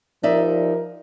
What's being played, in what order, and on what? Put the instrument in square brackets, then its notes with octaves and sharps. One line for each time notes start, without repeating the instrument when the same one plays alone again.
[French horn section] F3 G4 A#4 [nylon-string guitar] D#4 D5 E5